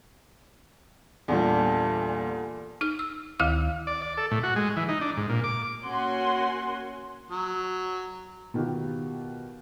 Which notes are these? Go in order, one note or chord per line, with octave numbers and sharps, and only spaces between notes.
E2 A#2 D3 G3
D#4 F6
E6
D2 D#3 E4 F5 F6
D5
D5
A4
A2
F#4
G#3
E3
D#4
D4
G#2
A#2
D6
A#3 C#4 F#4 F#5 G#5 C6
F#3
B2 D#3 F4 G4